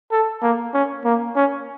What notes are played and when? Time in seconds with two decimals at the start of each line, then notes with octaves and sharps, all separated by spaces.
0.11 A4
0.42 A#3
0.74 C#4
1.05 A#3
1.36 C#4